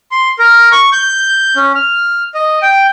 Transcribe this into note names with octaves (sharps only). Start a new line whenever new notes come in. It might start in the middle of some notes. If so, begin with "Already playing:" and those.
C6
A#4
C#6
G6
C#4
F6
D#5
G5